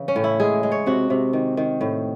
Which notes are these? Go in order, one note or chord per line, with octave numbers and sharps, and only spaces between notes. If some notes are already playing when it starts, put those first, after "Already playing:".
Already playing: C#3 E3
C#4
A2
E4
G#3 G#4
G#3
C#5
C3 F#4
C3
D#3
D#3
A2